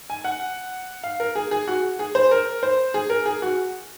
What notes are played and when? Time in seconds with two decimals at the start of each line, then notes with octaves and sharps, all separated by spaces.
0.10 G#5
0.24 F#5
1.04 F5
1.20 A#4
1.35 G#4
1.51 G#4
1.67 F#4
1.99 G#4
2.15 C5
2.31 A#4
2.63 C5
2.94 G#4
3.10 A#4
3.26 G#4
3.42 F#4